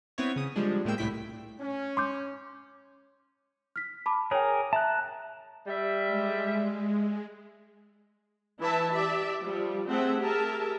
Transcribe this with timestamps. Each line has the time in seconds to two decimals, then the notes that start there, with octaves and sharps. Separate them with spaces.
0.18 B3 C4 E4 C#5
0.36 C#3 D#6
0.56 F3 G3 G#3 D4
0.85 A2 G#3 A#3 G5 E6
0.98 C2 A2 E4 G5 B6
1.59 C#4
1.97 C6 D6 G6
3.76 F6 B6
4.06 A5 B5 D6
4.31 G#4 A#4 C#5 G5
4.73 E5 A5 A#5 F#6
5.67 G3 E5
6.07 G#3
8.62 E3 E4 B4 E5 A5
8.95 G4 D5 E5
9.43 F3 G3 F4
9.89 A3 C4 G#4 A4 E5 F#5
10.21 G4 G#4 A#4 E5 A5